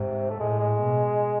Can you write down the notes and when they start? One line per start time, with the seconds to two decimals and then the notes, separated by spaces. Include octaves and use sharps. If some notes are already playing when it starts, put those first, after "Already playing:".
Already playing: G#2 C3
0.30 A3
0.40 A2 G#3
0.60 G#3
0.80 B2